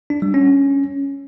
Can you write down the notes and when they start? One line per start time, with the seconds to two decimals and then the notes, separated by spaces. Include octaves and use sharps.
0.10 D4
0.22 G3
0.34 C#4